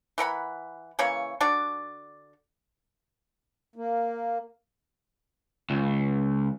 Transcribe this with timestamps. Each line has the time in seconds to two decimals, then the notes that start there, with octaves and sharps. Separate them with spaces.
0.18 E3 A#4 F#5 B5
0.99 C#3 E3 A#3 C#5
1.40 D3 D4 F#4 D5
3.76 A#3
5.70 C#2